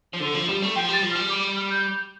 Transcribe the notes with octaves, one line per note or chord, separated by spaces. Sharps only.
F3
D3
F3
G3
A3
F3 G5
G3 A6
F3
F6
G3
D6
F6
G6